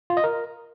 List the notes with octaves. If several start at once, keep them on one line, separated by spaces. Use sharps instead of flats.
F4
D#5
A#4